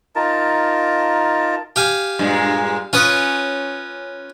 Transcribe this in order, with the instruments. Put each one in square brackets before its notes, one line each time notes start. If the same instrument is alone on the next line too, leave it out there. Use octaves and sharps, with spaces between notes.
[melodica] D#4 F4 A#4 A5
[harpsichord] G4 F5 G#5
[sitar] G2 A#2 G#3
[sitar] C#4 [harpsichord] F4 B4 D#6